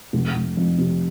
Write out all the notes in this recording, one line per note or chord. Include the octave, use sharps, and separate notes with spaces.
F1
F1
F2
C3